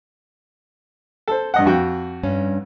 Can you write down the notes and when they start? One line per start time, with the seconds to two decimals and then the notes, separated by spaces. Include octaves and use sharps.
1.28 A4 C5
1.54 G2 D#5 F#5
1.66 F2 F#4 G5
2.23 G2 C#4